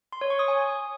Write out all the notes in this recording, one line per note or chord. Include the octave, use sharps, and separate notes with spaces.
C6
C#5
C#6
D#6
G#5